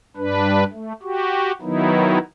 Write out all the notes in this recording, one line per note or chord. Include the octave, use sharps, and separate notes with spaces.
G2 D4 B4
A3
F#4 G4
D#3 F#3 B3 D#4 E4